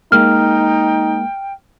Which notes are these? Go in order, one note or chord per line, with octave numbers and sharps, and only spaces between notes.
G#3 A#3 D#4 G5 F6